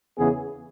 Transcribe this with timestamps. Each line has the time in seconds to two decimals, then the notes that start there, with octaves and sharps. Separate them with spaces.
0.17 E2 C#3 E3 B3 G#4